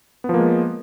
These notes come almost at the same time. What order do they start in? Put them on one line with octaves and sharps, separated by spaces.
B3 F3 A#3 G#3